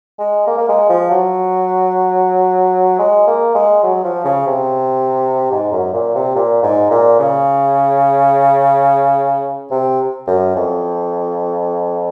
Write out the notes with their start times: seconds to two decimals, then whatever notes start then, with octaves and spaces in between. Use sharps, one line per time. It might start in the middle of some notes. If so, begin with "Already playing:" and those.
0.19 G#3
0.47 A#3
0.58 A#3
0.68 G#3
0.89 F3
1.11 F#3
2.99 G#3
3.27 A#3
3.55 G#3
3.84 F#3
4.04 F3
4.25 C#3
4.47 C3
5.51 G#2
5.72 F#2
5.93 A#2
6.15 C3
6.36 A#2
6.63 G#2
6.91 A#2
7.20 C#3
9.71 C3
10.27 F#2
10.56 F2